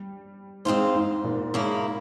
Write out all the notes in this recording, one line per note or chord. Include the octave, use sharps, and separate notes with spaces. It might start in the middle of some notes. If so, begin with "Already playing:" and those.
Already playing: G3
G#2 G#3 C4 F4 C5
G#2
A#2
G#2 C#3 F3 A#3 E4